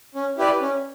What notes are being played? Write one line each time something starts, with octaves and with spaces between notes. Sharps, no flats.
C#4
E4 G4 B4 D5
C#4